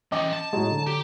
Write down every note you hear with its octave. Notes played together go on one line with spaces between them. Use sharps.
E3 C#4 D#5 G5 D6
A5
A2 F#3 G#3
D3
G4